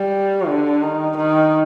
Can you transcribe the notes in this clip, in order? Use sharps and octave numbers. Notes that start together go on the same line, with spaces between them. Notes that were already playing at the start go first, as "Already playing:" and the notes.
Already playing: G3
D3
D#3
D#3